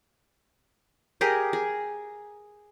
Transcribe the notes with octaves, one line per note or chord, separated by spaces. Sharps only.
G4 G#4 A#4 D#5
G#4